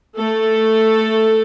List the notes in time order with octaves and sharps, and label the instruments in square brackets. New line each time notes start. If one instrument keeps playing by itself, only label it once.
[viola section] A3 A4